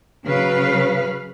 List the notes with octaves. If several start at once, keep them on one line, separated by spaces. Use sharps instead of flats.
C#3 F#3 B4 F5